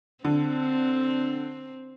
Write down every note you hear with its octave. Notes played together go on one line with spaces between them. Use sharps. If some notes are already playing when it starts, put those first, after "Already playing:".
D3 C4